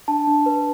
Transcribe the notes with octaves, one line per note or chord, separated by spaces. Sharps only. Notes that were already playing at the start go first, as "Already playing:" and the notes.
D4 A5
D4
B4